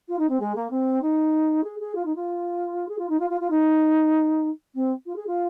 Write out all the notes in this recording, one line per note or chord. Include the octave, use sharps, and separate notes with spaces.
F4
D#4
C4
G#3
A#3
C4
D#4
G#4
G#4
F4
D#4
F4
G#4
F4
D#4
F4
F4
F4
D#4
C4
F4
G#4
F4